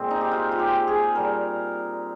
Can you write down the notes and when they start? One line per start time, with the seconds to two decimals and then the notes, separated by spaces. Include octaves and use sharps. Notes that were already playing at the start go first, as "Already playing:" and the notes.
Already playing: A#2 F3 G#3 C4
0.11 D#4
0.21 G4
0.31 F4
0.51 F4
0.59 G4
0.87 G#4
1.15 A#2 G3 A#4